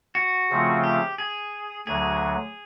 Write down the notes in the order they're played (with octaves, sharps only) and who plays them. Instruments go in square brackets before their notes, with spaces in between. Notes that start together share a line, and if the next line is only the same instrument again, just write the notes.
[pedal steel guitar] F#4
[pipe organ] C#3 F3 A3 C4 F4
[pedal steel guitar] G4
G#4
[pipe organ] D2 D3 F#3 [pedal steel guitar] G#4